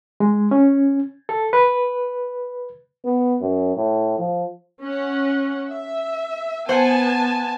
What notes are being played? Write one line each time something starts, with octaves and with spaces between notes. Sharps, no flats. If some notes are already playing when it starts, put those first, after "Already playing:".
G#3
C#4
A4
B4
B3
F#2
A2
F3
C#4 F#5
E5
B3 C5 F#5 G#5 A5